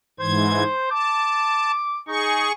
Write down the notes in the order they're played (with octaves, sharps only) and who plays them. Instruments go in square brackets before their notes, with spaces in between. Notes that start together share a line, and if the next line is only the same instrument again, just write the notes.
[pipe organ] G#2 E3 G#6 [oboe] C5
[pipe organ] A5 [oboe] D6
[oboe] D#4 [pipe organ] G#4 C#6